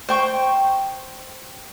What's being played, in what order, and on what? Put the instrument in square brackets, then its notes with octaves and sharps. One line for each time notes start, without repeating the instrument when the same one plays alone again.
[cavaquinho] C5 G5 C#6